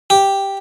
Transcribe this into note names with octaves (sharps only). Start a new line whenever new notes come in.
G4